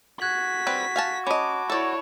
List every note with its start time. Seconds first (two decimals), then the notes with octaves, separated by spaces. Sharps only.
0.21 F#4 F#6 G#6 B6 F#7
0.67 G3 C4 B4
0.96 F5 G#5 A5
1.27 C#4 D#5 A5 B5 D6
1.70 E4 A4 C#5 D5 E7